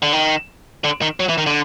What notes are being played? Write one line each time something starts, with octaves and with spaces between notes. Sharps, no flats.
D3
D#3
D3
D#3
F#3
E3
D#3
D3